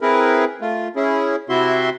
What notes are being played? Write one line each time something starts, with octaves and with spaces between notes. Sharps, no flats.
C4 E4 G#4 A#4 B4
A3 F4
C#4 E4 G#4
C3 C4 E4 F#4 E5 C6